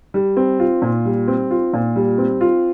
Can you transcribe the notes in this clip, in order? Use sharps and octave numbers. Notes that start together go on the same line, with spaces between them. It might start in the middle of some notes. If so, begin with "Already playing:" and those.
G3
C4
F4
A#2
G3
C4
F4
A#2
G3
C4
F4